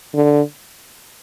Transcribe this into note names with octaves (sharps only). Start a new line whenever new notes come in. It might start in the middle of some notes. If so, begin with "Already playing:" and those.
D3